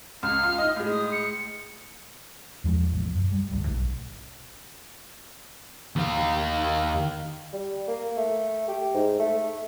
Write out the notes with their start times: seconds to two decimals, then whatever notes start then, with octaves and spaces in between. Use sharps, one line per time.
0.23 C#2 F6
0.43 F4
0.58 D#4 D#5
0.76 A2 G#3
0.89 D#6
1.12 C#7
2.64 E2 F3 G3 G#3
2.92 A1 B2 F3
3.14 F#2
3.32 G3
3.51 D#1 G#1 D2
3.67 B1
5.96 D#2 F5
7.53 G3
7.88 A#3
8.17 A3
8.68 G4
8.94 G#2
9.19 A3